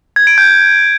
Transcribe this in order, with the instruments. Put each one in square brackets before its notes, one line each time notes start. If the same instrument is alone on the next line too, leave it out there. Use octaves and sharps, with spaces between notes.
[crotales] G#6
D7
G6